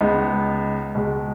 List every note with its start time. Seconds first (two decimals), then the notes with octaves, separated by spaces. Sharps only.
0.01 C#2 C#3 G#3 B3 D#4
0.95 C#2 B2 G#3